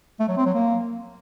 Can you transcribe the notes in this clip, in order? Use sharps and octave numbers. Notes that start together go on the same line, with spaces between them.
A3
F#3
C4
F#3
A#3